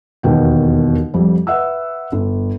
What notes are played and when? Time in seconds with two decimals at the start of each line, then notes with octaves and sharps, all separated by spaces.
0.23 E1 D#2 B2 G5
1.14 F2 G3
1.47 B4 E5 F#5 E6
2.12 G1